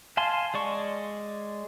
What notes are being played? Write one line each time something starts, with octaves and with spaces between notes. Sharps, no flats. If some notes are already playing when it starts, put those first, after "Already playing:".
F5 G#5 A5 C6
G#3 D5 C#6